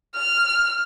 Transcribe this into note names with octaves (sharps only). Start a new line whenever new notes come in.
F6